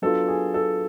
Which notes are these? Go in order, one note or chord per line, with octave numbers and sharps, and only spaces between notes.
F#3 B3 D4 F4 A4
G#4
A4